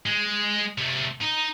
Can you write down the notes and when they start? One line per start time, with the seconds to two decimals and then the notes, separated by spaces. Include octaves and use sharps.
0.06 G#3
0.78 C3 A3
1.21 D#4